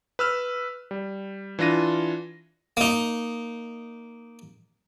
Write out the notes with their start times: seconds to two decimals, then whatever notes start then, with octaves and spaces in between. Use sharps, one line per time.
0.19 B4 E6 F6
0.91 G3
1.59 E3 D4 F4 A#6 D#7
2.77 A#3 D#4